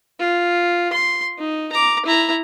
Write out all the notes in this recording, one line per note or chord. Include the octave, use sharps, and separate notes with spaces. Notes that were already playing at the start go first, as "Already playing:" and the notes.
F4
C6
D#4
A#5 D6
E4 A#5